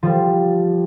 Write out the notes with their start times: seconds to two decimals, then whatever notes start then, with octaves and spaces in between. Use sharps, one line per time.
0.03 F3 G3